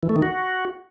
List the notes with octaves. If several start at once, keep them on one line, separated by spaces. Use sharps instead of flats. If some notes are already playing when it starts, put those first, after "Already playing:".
E3
A3
D#3
F#4